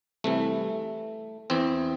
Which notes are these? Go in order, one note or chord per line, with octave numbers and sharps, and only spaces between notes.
C2 C3 E3 A3
E2 E3 C4